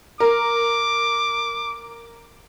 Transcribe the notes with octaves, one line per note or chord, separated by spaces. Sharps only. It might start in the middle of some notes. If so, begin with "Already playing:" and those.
A#4 D6